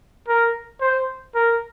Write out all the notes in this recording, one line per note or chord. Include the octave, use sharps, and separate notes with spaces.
A#4
C5
A#4